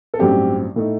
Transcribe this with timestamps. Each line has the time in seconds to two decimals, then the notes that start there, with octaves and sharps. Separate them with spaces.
0.14 A4
0.19 A1 G2 F#3 C4 G4
0.76 A2 A3 D#4